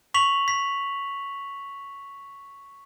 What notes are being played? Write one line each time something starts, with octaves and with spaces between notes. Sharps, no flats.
C#6 B6 F7 F#7
B6